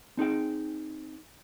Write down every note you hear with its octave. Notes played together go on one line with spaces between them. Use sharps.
C4 D#4 G#4 G5